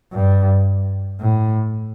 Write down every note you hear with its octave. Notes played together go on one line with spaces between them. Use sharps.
G2
A2